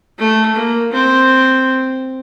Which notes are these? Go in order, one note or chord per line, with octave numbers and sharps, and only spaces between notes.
A3
A#3
C4